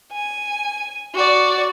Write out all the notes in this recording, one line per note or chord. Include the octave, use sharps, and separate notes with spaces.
G#5
F#4 D5